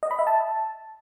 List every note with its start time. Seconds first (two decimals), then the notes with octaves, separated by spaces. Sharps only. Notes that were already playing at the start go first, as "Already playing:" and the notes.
0.03 D#5
0.11 B5
0.19 E5
0.27 A5